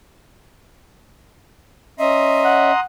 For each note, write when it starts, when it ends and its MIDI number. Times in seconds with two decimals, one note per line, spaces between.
1.99 2.71 61
1.99 2.72 75
1.99 2.71 76
1.99 2.80 82
1.99 2.80 84
1.99 2.80 87
2.44 2.83 78